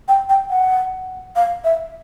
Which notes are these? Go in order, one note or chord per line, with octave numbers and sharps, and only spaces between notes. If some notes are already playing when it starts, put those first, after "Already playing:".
G5
G5
F#5
F5
E5